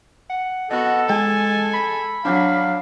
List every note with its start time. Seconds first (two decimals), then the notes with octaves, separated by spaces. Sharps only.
0.30 F#5
0.71 B3 F#4 A4 D#5
1.09 G#3 G#5 A5
1.74 B5
2.25 F#3 D4 F5